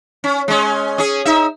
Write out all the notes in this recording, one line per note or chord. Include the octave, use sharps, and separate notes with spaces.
C#4
G#3 C#4
C#4 G#4
D#4 E5